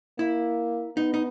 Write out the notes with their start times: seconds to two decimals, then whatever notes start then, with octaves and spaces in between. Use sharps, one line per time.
0.18 A#3 E4
0.97 B3 D#4
1.14 D#4